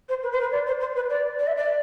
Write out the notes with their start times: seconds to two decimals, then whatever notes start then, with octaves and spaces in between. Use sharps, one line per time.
0.09 C5
0.23 B4
0.32 C5
0.41 B4
0.52 D5
0.67 C5
0.80 C5
0.95 B4
1.10 D5
1.39 D5
1.47 E5
1.57 D5